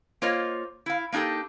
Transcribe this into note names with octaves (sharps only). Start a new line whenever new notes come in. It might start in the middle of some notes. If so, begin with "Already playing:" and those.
A#3 F4 C5 C#5 D#5
E4 F5
A#3 D4 D#4 G4 A4